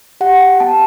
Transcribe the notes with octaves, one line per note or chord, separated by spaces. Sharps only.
G4 F#5
G5
B3 A5